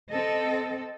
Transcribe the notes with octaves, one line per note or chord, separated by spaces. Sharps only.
C4 A4 D#5